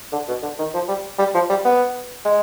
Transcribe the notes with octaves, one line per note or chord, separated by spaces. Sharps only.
D3
B2
D3
D#3
F3
G3
G3
F3
G3
B3
G#3